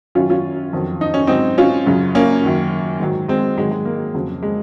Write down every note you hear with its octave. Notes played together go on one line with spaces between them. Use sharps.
F#2 D#3 F#3 C#4 F4
C#4 F4
F2 D#3 F#3
D#4
C#4
G#2 F#3 C4 D#4
C#4 F4
F#2 C#3 F#3
A#3 C#4
F#2 D#3 F#3
G#2 D#3 F#3
G#3 C4
G#2 D#3 F#3 G#3
G#3
A#3
F2 C#3 F#3
G#3